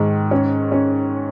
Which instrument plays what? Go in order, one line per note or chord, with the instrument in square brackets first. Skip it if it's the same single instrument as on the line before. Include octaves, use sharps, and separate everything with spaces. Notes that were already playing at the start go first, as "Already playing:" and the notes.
Already playing: [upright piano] G#2 D#3
C#4
C#4